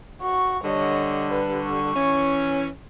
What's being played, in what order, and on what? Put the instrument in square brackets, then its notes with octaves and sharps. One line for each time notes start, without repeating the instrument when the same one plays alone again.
[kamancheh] F#4 C#6
[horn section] D3 G3 [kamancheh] C#5 D#5
[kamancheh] B4
C#6
[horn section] E3 C#4